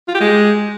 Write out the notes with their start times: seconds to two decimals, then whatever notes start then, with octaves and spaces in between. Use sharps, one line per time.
0.08 F4
0.14 G4
0.20 G#3